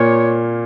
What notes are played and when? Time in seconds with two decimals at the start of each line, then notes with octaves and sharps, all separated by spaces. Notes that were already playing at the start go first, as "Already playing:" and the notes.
Already playing: A#2 A#3 C#5